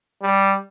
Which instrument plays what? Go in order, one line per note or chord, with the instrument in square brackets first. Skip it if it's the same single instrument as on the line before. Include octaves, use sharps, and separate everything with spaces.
[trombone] G3